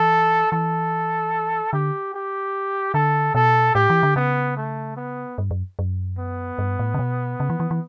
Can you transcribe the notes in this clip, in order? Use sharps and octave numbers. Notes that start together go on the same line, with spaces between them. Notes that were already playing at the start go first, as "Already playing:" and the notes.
Already playing: E3 A4
E3 A4
D3 G4
G4
D3 A4
B2 A4
A2 G4
E3
D3
C#3 B3
A3
B3
G2
F#2
F#2
B3
G2
A2
C#3
B2
C#3
E3
E3
E3